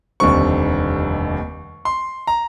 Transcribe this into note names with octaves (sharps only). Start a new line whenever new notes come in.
F1 D#2 D3 G3 C4 C#6
C6
A#5